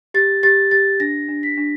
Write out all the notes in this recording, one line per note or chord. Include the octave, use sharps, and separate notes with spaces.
G4 A6
G4 A6
G4 A6
D4 A#6
D4
B6
D4